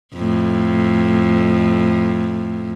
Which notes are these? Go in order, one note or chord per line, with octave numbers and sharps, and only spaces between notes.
F2 A2